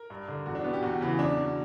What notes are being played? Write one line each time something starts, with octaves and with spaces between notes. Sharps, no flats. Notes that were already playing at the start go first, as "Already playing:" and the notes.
Already playing: A#4
G2
D3
E2 F#4
D4
B2 B3
G4
E2 F#4
C#3 E3
E2 D4
B2